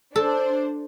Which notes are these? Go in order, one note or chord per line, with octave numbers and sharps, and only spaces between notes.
D4 A4 C5